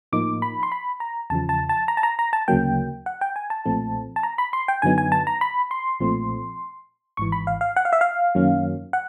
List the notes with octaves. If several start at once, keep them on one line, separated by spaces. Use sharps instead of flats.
A2 F3 A#3 D#4 D6
B5
C6
B5
A#5
E2 C#3 F3 A5
A5
A5
A#5
A5
A#5
A#5
A5
D2 C#3 F#3 A#3 G5
F#5
G5
G#5
A5
B1 A#2 F3 A3 C4
A5
A#5
B5
C6
G5
F#2 D3 F#3 B3 D#4 G#5
G#5
A5
A#5
B5
C6
B1 A#2 F3 A3 C4
G#1 G#2 E3 C#6
B5
F5
F5
F#5
F5
E5
F5
F#2 D#3 F#3 A#3 C#4
F#5